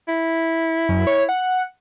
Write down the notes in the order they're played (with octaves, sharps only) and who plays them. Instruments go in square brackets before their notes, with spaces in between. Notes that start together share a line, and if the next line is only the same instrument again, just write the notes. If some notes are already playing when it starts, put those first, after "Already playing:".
[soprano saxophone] E4
[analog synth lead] F#2
C#5
F#5